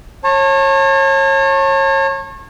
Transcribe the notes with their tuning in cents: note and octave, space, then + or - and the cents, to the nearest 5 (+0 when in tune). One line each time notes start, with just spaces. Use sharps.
C#5 -30 A5 +25